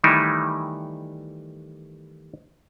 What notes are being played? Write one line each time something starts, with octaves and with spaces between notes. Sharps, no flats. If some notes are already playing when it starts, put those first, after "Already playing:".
D#3 E3 G3 A3 D#4 E4